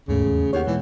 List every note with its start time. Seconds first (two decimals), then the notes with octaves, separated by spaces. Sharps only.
0.08 D#2 G#2 C#3 A3
0.25 E2
0.53 D#2 C#5 F#5
0.67 B2 E3 G#3